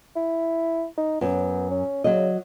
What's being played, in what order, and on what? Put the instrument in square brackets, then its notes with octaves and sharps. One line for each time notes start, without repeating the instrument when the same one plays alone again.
[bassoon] E4
D#4
[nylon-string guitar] F#2 [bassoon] B3
[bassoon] C#4
[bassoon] C#3 [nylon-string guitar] F#3 D#5